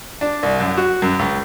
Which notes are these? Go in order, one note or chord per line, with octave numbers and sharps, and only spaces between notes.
D4
C2
F#2
F#4
F#2
C#2